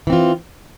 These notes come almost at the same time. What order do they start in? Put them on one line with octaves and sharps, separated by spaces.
E3 C4 F4